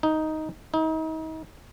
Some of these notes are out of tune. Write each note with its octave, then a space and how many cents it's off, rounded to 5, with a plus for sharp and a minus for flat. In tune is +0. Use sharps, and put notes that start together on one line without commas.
D#4 +5
D#4 +35